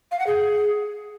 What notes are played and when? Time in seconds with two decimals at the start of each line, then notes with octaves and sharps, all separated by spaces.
0.12 F5
0.19 F#5
0.27 G#4